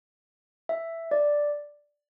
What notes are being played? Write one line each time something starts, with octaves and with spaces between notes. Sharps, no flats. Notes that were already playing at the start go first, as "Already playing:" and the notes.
E5
D5